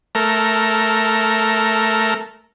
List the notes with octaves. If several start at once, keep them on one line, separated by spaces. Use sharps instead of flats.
A3 A#4